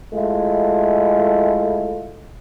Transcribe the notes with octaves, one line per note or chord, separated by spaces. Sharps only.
G#3 A3 E4 F4